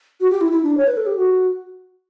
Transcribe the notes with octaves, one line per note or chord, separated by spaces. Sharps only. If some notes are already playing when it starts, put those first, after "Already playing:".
F#4
G4
E4
E4
D4
C#5
B4
A4
G4
F#4